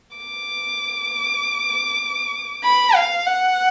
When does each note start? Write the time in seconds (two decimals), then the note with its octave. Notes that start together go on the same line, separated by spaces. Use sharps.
0.17 D6
2.64 B5
2.95 F5
3.25 F#5